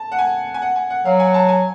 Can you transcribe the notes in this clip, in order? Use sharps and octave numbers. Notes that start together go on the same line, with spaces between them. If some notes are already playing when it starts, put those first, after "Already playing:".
Already playing: A5
F#5
G#5
G#5
F#5
G#5
F#5
F#3 F5
G#5
A5
G#5